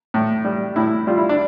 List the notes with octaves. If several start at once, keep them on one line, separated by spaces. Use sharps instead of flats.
A2
G3
A2 E4
G3 F4
E4
D4